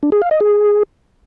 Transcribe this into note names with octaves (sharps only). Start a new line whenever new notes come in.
D4
G#4
F5
D#5
G#4